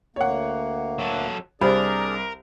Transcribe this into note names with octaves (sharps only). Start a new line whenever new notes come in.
D2 A#3 C#5 F#5
F#3 A4
C2 D4 G4 G#4 A#4 C5 D5 B5